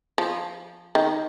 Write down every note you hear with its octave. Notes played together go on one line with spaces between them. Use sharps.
F3
D#3